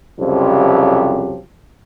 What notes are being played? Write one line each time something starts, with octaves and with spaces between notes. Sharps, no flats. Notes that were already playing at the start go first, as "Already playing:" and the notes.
C2 F2 C#3 F3 F#3 G4